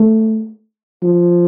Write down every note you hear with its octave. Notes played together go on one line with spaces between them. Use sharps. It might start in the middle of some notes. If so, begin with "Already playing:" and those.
Already playing: A3
F3